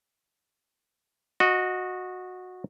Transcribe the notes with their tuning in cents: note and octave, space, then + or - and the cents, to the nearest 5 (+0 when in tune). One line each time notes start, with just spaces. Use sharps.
F#4 -15 D#5 -5